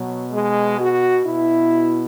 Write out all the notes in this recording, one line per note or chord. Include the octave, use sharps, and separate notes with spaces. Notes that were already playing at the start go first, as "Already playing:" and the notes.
Already playing: B2 F#3
G#3
F#4
B2 E4